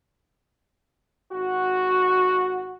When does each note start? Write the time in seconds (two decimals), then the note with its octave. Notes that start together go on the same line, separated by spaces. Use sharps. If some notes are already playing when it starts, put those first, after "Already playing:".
1.31 G#1 F#4